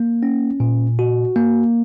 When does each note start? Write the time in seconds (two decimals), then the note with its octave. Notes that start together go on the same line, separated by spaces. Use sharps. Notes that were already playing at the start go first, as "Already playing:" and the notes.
Already playing: A#3
0.23 C#4
0.60 A#2
0.99 F#4
1.36 A#3